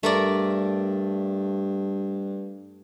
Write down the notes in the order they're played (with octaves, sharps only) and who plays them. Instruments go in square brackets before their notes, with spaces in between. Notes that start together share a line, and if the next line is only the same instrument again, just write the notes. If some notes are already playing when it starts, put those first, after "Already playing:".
[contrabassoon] G2 [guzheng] A3 A#4 D5